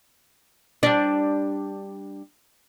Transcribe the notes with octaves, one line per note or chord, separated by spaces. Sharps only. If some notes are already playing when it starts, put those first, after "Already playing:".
G3 D4